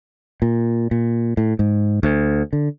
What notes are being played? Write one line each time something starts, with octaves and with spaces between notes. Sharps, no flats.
A#2
A#2
A2
G#2
D2
D3